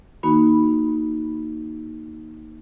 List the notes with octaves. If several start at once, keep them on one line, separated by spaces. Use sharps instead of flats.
D#3 A#3 D#4 F#4 B5